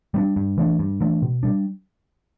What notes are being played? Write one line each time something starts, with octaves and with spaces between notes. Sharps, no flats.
G3 B3 D4
G2
E3 A3 D4
G2
E3 A3 D4
B2
G3 D4